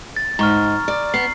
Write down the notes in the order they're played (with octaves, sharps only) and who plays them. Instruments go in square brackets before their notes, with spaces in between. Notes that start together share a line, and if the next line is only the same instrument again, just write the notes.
[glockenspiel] A6
[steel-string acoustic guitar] G#2 [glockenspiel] A#5 C#6 F6
[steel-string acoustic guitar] D5
[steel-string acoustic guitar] B3 [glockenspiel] C7